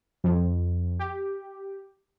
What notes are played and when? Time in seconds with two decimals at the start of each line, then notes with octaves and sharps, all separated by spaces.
0.24 F2
0.99 G4